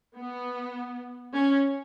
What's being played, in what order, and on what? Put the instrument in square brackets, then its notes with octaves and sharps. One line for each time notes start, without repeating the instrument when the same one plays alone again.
[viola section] B3
C#4